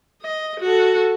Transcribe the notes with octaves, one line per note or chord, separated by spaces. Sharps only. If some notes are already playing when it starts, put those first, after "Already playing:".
D#5
F#4 A4